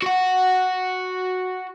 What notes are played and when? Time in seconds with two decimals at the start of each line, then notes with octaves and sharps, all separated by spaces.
0.02 F#4 F#5